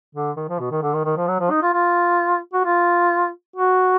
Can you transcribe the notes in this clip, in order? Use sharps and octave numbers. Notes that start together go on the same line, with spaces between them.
D3
D#3
F3
B2
D#3
D3
D#3
D#3
F3
F#3
F3
D#4
F4
F4
F#4
F4
F#4